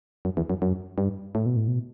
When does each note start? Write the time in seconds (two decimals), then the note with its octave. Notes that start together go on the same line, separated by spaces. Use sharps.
0.25 F#2
0.37 E2
0.50 F#2
0.62 F#2
0.98 G2
1.35 A2
1.46 B2
1.57 A2
1.68 B2